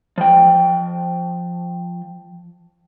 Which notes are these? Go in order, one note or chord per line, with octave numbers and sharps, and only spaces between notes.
F3 G5